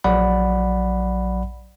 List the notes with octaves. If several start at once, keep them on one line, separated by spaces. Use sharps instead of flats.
A#1 F#3 D5 F#5 B5